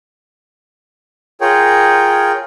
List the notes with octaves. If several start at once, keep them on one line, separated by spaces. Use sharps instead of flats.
F4 G#4 A#4 C#5 G5